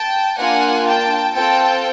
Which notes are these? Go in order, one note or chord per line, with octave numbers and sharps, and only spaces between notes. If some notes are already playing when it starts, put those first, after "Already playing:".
Already playing: G5 A5
A#3 D4 F4 F#5 G#5
G5 A5
C4 F4 A4 G5 A5